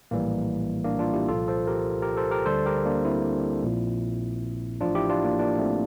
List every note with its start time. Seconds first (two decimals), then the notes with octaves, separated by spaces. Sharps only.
0.11 A#1 A2 E3 G3 A#3
0.84 A#3 D4
0.99 D4 F4
1.14 E4 G4
1.28 C2 A#2 F3 F4 A4
1.48 A4 C5
1.67 G4 A#4
2.02 G4 A#4
2.17 A4 C5
2.31 G4 A#4
2.46 D2 D3 G3 A4 C5
2.66 G4 A#4
2.85 A#3 D4
3.05 C4 E4
3.63 A#1 A#2 F3
4.81 A1 A2 F3 D4 F4
4.95 E4 G4
5.10 D4 F4
5.24 A#3 D4
5.39 A#3 D4
5.59 A3 C4